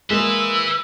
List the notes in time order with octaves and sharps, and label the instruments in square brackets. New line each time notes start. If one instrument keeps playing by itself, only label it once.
[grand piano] G#3 A#3 [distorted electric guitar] B4 E5 [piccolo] E6